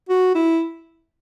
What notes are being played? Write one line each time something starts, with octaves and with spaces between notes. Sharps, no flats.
F#4
E4